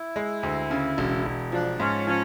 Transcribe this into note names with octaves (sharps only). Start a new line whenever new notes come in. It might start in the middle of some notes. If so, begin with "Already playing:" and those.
Already playing: E4
G#3
D2
C#3
E1
E1
F3 D4
G#2 C#4
F3 C#4